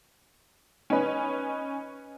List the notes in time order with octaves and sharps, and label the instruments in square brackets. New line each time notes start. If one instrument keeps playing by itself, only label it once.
[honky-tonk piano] C#4 D#4 B4